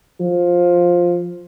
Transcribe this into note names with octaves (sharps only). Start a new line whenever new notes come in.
F3